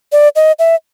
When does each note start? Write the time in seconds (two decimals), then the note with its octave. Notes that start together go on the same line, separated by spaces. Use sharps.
0.12 D5
0.36 D#5
0.59 E5